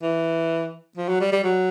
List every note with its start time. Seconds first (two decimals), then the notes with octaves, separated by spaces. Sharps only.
0.03 E3
0.97 F3
1.09 F#3
1.21 G3
1.32 G3
1.44 F#3